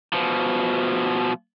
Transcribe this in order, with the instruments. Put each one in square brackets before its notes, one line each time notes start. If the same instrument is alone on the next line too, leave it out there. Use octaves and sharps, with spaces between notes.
[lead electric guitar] B2 F3